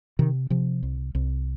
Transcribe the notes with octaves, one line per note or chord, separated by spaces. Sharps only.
C3 D#3
C3 F3
C2
C2